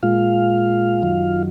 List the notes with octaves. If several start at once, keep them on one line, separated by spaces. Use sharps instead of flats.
A#2 G#3 F4 F5
F#2 D#3 F#3